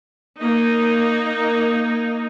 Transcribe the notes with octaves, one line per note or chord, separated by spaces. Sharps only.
A#3 D#4